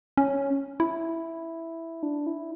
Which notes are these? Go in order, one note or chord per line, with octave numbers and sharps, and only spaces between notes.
C#4
E4
D4
E4